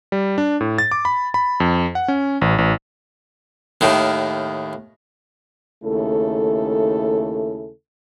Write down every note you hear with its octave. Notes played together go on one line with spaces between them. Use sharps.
G3
D4
A2
A6
D6
B5
B5
F2
F#5
C#4
A1
A1
D#2 A2 D#3
D#2 C#3 A3 E4 A4